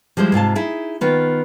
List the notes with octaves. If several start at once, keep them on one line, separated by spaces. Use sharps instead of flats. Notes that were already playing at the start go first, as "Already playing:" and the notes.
F3 G3 G#3 E4 C5
G#2 C3 F4 A5
D#4 E4 G#4
D#3 B3 F4